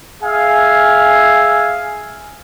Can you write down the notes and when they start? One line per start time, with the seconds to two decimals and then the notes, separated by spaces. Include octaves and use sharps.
0.23 G#4 E5 F5 G#5